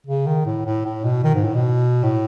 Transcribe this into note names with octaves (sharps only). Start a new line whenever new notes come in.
C#3
D#3
A2
A2
A2
B2
D#3
G#2
A2
B2
A2